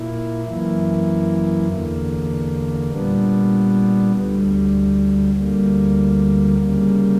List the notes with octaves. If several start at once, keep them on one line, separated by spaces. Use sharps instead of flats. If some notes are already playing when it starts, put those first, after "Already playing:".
Already playing: A#2 A#3 E4
F#2 E3 A#3 E4
E2 D3 A#3
A#2 G3 B3 D4
D2 D3 G3
D2 D3 G3 A#3
C#3 G3 A#3